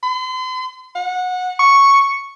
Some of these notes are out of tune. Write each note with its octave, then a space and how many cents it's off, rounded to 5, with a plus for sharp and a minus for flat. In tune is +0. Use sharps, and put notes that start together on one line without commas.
C6 -40
F#5 -20
C#6 +0